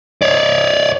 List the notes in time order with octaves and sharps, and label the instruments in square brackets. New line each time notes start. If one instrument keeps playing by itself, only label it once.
[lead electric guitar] C#5 D5